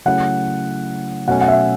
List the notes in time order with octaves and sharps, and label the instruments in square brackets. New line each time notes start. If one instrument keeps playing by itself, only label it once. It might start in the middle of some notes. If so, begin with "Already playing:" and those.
[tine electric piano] C#3 F#3 A3 C#4 E4 [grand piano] F#5
[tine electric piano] B2 F#3 A3 C#4 [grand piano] F#5
[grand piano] F#5
E5